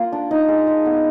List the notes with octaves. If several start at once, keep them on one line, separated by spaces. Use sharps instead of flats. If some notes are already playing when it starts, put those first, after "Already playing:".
Already playing: A#3 F4
D4
D#4
G#3
G#3
B3